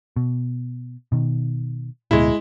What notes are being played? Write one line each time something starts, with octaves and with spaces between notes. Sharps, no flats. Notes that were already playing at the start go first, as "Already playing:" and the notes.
B2
B2 D#3
D1 D2 B2 G#3 E4